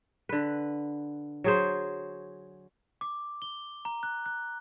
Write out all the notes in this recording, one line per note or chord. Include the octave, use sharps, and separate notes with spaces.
D3 B4
F#3 G#4 C5
D6
G7
A#5
F#6
F#6